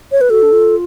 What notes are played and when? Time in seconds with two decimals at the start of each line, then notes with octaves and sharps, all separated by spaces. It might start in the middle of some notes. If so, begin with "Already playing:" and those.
0.12 C#5
0.21 B4
0.30 F#4 A4
0.42 D4
0.52 F4